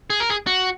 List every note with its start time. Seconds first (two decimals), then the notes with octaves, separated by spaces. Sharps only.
0.10 G#4
0.20 A#4
0.30 G#4
0.47 F#4